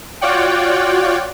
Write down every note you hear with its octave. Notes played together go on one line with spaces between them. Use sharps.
F4 F#4 C#5 D5 F#5 G5